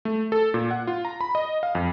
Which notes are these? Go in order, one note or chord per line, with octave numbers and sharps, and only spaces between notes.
A3
A4
A#2
F#5
F4
A#5
B5
D#5
F5
F2